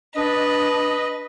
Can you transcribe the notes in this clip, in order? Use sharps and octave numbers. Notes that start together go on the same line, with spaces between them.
D4 B4 D#5